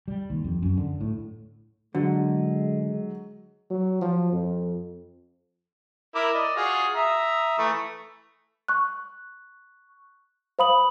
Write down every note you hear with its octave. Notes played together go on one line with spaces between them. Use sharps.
G3
D#2
F2
F#2
D3
A2
D3 F#3 G#3
F#3
F3
F2
E4 A#4 D6
D5 D#5
F4 F#4 G#4
E5 A#5 D#6
E3 A3
C#6 F#6
C5 F5 B5 D#6 F#7